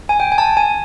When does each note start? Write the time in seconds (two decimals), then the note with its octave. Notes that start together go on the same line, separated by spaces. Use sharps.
0.09 G#5
0.20 G5
0.32 G#5
0.38 A5
0.57 G#5